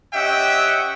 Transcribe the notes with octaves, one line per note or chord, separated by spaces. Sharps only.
C#4 G4 D#5 E5 F#5 G5